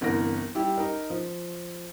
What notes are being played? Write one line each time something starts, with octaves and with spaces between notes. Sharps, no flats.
G1 C2 E3 A#4 A#6
G3 E4 G4
D#4 A#4
F3